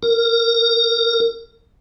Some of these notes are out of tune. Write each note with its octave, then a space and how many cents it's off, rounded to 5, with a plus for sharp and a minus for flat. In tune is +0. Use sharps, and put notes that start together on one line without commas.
A#4 -15